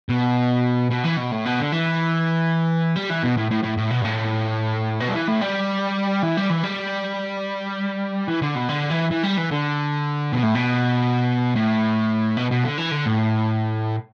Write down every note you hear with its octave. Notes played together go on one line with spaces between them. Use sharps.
B2
B2
E3
B2
A2
B2
D3
E3
G3
E3
B2
A2
A2
A2
A2
B2
G2
A2
B2
G3
E3
A2
G3
E3
G3
E3
G3
E3
D3
B2
D3
E3
E3
G3
E3
D3
B2
A2
B2
A2
B2
B2
D3
E3
D3
A2